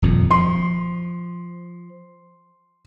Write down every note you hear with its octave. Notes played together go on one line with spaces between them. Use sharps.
D#1 F2 A#2
F3 C6